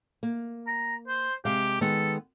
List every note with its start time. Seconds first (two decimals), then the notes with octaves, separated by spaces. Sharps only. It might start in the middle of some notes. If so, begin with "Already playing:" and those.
0.23 A#3
0.67 A#5
1.08 C5
1.45 C3 G#3 G4 F5
1.81 D#3 G#3 B3 A4